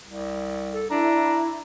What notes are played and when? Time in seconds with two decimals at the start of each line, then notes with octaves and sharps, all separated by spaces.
0.06 C2
0.74 A4
0.90 D4 E4 A#5